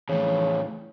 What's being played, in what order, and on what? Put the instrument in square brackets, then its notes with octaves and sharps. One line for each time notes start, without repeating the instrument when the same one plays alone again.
[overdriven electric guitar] F2 A2 [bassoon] C#3 [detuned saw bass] E3